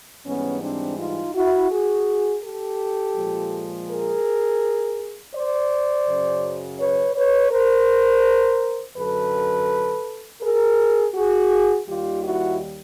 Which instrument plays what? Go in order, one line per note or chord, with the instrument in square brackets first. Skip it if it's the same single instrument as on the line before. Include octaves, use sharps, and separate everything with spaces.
[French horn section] G#2 E3 G3 B3 C#4
C4 D4
D#4 F4
E4 F#4
F#4 G#4
G4 A4
A#2 F3 G#3
G#4 A#4
C5 D5
F#2 C#3 F#3
B4 C#5
B4 C#5
A#4 C5
F#2 D3 F#3 A4 B4
G#4 A#4
F#4 G#4
D#2 D#3 G3 F4 G4
E4 F#4